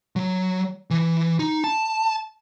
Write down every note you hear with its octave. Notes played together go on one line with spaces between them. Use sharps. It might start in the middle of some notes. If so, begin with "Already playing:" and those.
F#3
E3
D#4
A5